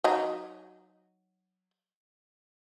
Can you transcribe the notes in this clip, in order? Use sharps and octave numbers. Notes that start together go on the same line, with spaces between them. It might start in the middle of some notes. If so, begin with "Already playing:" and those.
F#3 D#4